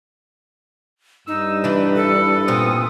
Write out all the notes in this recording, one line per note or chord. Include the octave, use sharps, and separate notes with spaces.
G2 D#4 E6
E3 D4 B4
A4
A#2 B3 C4 D#6